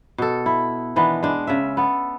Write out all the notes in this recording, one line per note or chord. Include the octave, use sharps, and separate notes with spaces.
B2 A4
E4
D#3 E3 B3 D4
G#3 D4
C#3 E5
B3 A4